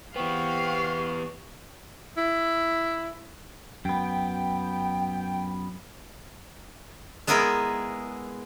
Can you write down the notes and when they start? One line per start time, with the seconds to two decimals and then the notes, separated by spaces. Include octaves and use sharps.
0.16 E3 B3 C4 G4 F5 C#6
2.17 E4
3.85 F#2 B3 G5
7.27 G#3 B3 E4 G#4 A#4 B4